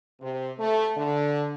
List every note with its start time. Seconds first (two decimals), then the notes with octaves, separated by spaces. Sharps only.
0.21 C3
0.58 A3
0.96 D3